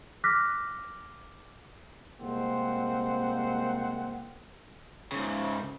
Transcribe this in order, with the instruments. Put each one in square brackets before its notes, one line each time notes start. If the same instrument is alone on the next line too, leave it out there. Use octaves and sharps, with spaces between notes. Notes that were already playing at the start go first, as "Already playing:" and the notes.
[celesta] D6 F6 F#6 A#6 B6
[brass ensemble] C2 G#3 A#3 C4 C5 F#5
[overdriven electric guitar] G#2 C#3